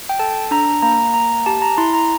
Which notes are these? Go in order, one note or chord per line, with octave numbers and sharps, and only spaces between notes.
G5
A4 A5
D4 A#5
A#3 A#5
A#3 A#5
G4 A5
A#5
E4 C6
A#5